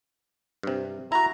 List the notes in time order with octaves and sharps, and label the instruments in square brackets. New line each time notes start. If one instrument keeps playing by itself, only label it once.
[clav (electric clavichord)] G2 C3
[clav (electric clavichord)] E4 F#4 [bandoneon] A#5